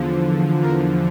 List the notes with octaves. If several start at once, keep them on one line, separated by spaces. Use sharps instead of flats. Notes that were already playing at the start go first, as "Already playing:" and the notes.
Already playing: E2 D3 F3
A#4